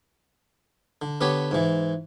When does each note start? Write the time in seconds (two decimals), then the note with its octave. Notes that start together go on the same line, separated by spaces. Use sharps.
1.02 D3
1.21 D3 B3 G4 B4 C#5
1.51 G#2 E3